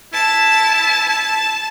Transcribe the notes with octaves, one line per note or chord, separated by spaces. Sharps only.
E4 A5
A5